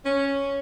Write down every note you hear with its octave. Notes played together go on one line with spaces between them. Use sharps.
C#4